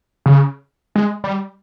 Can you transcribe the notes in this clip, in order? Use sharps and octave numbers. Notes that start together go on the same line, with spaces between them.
C#3
G#3
G3